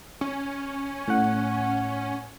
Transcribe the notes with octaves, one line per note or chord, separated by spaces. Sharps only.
C#4
A2 F#5